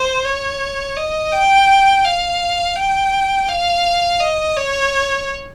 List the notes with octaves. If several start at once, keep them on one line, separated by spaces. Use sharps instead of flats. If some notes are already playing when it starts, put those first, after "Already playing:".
Already playing: C5
C#5
D#5
G5
F5
G5
F5
D#5
C#5